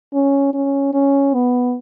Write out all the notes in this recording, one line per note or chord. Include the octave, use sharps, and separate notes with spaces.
C#4
C#4
C#4
B3